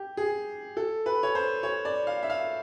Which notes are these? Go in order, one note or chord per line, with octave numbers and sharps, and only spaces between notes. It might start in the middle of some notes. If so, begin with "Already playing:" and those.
Already playing: G4
G#4
A4
B4
C#5
C5
C#5
D5
F5
E5
F5